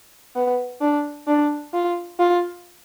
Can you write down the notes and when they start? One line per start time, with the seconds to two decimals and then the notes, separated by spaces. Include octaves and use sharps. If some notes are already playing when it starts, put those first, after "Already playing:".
0.36 B3
0.81 D4
1.27 D4
1.73 F4
2.19 F4